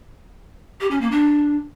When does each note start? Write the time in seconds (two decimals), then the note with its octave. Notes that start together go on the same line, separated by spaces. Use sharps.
0.81 G4
0.91 C#4
1.01 A#3
1.11 D4